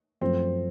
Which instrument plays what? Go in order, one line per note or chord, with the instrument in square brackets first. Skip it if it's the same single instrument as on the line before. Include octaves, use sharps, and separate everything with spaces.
[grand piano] F#2 F3 A3 [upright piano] C4